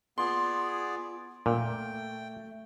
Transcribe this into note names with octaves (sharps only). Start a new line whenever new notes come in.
B3 F4 G#4 D5 C6
A#2 A3 G5